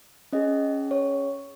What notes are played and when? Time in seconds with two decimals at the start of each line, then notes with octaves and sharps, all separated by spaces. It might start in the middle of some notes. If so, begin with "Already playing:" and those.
0.33 C#4 G#4 D#5
0.91 C#5